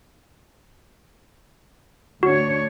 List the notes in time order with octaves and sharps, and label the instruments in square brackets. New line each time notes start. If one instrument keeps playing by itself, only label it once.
[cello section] D2 D4 C#5 [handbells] F#4